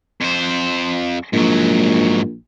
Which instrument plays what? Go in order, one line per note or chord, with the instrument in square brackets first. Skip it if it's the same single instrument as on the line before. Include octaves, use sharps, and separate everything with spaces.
[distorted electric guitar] F2 C5
[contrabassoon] A#1 [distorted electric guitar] G#2 F#3